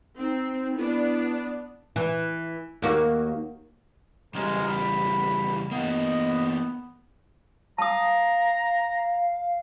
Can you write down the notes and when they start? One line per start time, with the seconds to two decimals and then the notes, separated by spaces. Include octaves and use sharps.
0.17 C4 D#4
0.76 B3 D4 E4
1.96 E3
2.82 D#2 A#3 F#4
4.35 C#3 E3 G3 G#3 A#4
4.68 B5
5.71 E3 A#3 B3 D#5
7.78 F5 A5 A#5 D#6